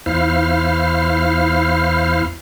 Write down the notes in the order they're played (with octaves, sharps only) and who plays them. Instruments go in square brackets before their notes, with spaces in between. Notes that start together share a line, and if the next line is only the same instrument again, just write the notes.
[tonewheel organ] E2 E4 C5 F5 F6